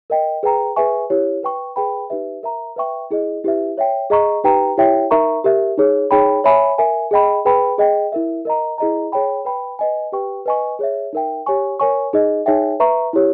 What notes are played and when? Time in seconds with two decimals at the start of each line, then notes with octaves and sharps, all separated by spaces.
0.10 A#4 D#5 G5
0.43 G#4 B4 G5 A#5
0.76 G#4 B4 E5 G#5 C#6
1.10 E4 G4 C#5
1.43 B4 G5 C#6
1.76 G#4 B4 G5 B5
2.10 D#4 G4 B4 E5
2.43 A#4 E5 A#5
2.76 B4 E5 G5 C#6
3.10 E4 G#4 D#5
3.44 E4 G4 B4 E5
3.78 C#5 E5 G5
4.10 G#4 D#5 A#5 C#6
4.44 D#4 G4 B4 G5 A#5
4.77 E4 G4 C#5 E5 G5
5.11 D#4 A#4 E5 A#5 C#6
5.44 G4 A#4 E5
5.78 D#4 G#4 C#5
6.11 D#4 G#4 C#5 G5 B5
6.44 C#5 E5 G#5 B5
6.78 A#4 E5 G#5
7.11 G#4 D#5 G5 B5
7.45 G#4 B4 G5 B5
7.78 G#4 D#5 G5
8.12 E4 A#4 E5
8.45 A#4 D#5 A#5
8.78 E4 G#4 D#5 A#5
9.12 G#4 C#5 G5 B5
9.45 B4 G5 B5
9.79 B4 D#5 G#5
10.12 G4 B4 G5 C#6
10.46 B4 D#5 G#5 C#6
10.79 G#4 C#5 E5
11.13 D#4 A#4 E5 G5
11.46 G4 C#5 G#5 C#6
11.80 A#4 C#5 G#5 C#6
12.13 D#4 G#4 D#5
12.46 D#4 G#4 C#5 E5 G5
12.80 B4 E5 A#5 C#6
13.13 E4 G4 C#5